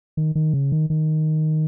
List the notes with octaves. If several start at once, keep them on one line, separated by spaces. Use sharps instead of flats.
D#3
D#3
C#3
D#3
D#3